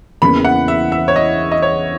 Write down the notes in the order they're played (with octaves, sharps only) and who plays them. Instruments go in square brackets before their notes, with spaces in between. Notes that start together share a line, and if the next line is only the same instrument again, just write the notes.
[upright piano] E2 C#3 E3 A#3 [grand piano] B5
[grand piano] F#5
E5
E5
C#5
D#5
D#5
C#5